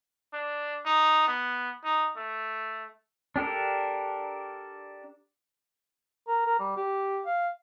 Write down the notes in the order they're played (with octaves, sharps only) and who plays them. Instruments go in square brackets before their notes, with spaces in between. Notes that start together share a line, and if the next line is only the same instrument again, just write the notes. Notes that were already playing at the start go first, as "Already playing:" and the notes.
[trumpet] D4
D#4
B3
D#4
A3
[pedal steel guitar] D4 G4 A4 A#4
[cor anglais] A#4
A#4
G3
G4
F5